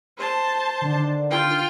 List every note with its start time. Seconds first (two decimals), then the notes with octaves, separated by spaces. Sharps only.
0.17 C5 A5
0.81 D3 D#3 D4
1.30 F4 G5